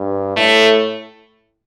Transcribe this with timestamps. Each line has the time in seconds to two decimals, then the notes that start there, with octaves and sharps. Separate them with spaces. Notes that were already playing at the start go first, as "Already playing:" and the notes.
Already playing: G2
0.36 A2 A3